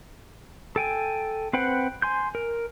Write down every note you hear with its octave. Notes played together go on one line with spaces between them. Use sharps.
A4 G5 G#5
C4 B4 C5 F#5 G5
G#5 C6 G6
A#4